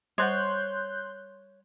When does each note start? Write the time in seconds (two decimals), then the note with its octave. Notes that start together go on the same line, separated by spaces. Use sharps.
0.18 G3 C5 C#5 F#5 C6 F#6 G6